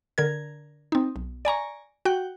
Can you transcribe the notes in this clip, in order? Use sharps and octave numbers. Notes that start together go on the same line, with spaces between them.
D3 A#4 G#6
C4 D#4
B1
D5 G#5 A#5 C#6
F#4 G5 F#6